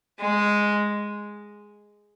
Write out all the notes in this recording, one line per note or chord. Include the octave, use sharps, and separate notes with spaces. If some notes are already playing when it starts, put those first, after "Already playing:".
G#3